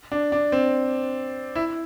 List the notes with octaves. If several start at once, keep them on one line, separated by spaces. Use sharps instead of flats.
D4
D4
C4
E4